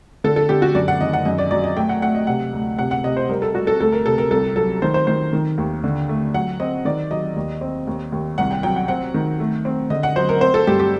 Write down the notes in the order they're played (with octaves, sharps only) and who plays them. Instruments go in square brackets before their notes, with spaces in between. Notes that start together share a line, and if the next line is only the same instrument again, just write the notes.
[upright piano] D3 A4
A4
D3 G4
F#4
F#2 D5
F#5
D#3 D#5
F#5
F#2 D#5
D5
F#3 D5
D#5
A3 G5
F#5
A3 F#5
D#5
C3 F#5
D2
C3 F#5
F#5
C3 D#5
C5
G3 A#4
A4
G3 F#4
A4
D2 A4
A#4
C3 A4
A#4
C2 A4
F#3 A4
D#3 C5
C5
D#3 C5
D#3
D#2
D3
A3
F#3 F#5
C4 D#5
D#3 D5
F#3 D#5
D#2
C4
D#2
D#2
C2 F#5
G5
F#3 G5
F#5
C4 F#5
D#3
A3
C4
D3 D#5
F#5
F#3 C5
A#4
C4 C5
A4
G2 G4
G4